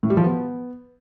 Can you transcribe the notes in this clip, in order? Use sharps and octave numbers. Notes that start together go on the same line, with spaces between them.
A2
G3
F3
B3